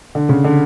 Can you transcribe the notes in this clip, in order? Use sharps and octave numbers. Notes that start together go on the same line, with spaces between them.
D3
C#3
D3